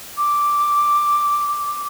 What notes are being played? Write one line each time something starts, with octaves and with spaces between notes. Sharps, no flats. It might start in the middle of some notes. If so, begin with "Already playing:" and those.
D6